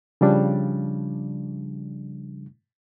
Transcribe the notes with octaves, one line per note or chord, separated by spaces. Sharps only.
C#3 F3 G3 D4